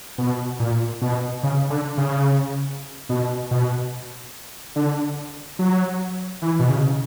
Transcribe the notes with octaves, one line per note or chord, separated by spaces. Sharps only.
B2
A#2
B2
C#3
D3
C#3
B2
B2
D3
F#3
E3
B2
C#3